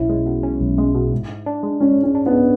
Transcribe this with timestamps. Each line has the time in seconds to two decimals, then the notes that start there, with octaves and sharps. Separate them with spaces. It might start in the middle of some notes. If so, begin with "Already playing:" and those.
Already playing: B1 C#4 E4
0.09 G#3
0.26 B2
0.43 C#4
0.61 B1
0.78 G#3
0.95 B2
1.12 G#2
1.29 G#2
1.46 D4
1.63 G#3
1.80 G#2 C#4
1.97 G#2
2.03 C#4
2.15 D4
2.26 B3
2.31 G#3